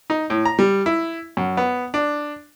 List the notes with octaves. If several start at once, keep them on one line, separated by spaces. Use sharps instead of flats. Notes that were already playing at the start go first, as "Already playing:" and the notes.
D#4
A2
A#5
G3
E4
F#2
B3
D4